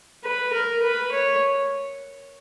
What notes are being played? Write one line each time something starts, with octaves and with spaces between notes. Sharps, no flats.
B4
A#4
B4
C#5